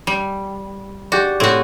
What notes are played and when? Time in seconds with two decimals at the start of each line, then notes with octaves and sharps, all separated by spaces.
0.07 G3
1.12 F#4 G4 D5
1.40 A2 C4 F#4 C#5 D#7